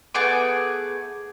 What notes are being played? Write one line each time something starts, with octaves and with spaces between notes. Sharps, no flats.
A3 B3 G#4 D6